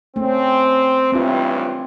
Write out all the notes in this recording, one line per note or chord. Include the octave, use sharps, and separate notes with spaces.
A3 C4 C#4
C#2 G2 E3 C4 F4